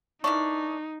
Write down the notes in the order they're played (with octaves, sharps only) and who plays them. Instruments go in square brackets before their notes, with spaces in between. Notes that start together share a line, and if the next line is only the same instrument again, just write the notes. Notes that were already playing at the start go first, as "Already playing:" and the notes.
[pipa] D#3 E3 D4 [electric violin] D#4 [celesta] C#6